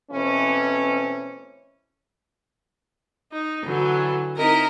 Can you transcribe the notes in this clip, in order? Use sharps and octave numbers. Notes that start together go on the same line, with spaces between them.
B2 E3 A3 C4 C#4
D#4
D3 E3 F#3
C4 D#4 E4 A#4 D#5 A#5